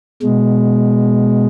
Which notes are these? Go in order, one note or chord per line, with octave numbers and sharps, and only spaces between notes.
B2 G#3